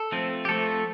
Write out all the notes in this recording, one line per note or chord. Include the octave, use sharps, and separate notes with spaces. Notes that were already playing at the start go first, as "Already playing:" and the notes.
Already playing: A4
F3 A3 C4
G4
F3 A3 C4 A4